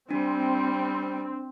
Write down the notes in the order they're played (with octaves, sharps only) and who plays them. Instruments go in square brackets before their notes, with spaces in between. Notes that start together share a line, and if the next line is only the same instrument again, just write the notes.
[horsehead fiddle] G3 [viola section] C4 [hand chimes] D4